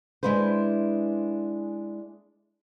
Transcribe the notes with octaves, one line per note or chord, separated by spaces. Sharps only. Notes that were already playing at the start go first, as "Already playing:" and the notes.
G#3 D4 E4 B4 C5